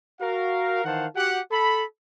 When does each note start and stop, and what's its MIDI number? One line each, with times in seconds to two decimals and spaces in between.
0.20 0.82 66
0.20 0.82 70
0.20 0.82 77
0.85 1.06 51
0.85 1.06 52
0.85 1.06 72
0.85 1.06 77
0.85 1.06 78
0.85 1.06 81
1.15 1.39 66
1.15 1.39 67
1.15 1.39 78
1.51 1.83 69
1.51 1.83 83